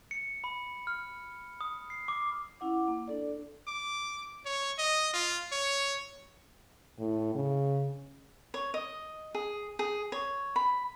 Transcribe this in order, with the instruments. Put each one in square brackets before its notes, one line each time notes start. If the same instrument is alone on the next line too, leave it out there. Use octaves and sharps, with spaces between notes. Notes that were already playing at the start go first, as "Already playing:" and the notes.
[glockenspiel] C#7
B5
F6
D#6
C7
D6
[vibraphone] C#4 E4 F#5 D6
A#3
D4 A4 D5
[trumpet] D6
C#5
D#5
F4
C#5
[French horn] A2
C#3
[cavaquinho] C#5
D#5
G#4
G#4
C#5
B5